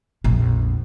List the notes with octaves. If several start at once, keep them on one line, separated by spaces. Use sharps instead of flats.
A#1 F2